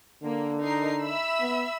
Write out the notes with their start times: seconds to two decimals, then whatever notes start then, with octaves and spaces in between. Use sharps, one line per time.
0.23 D3 A#3
0.61 D#4 A#4 C7
1.03 E5 B5 E6
1.41 B3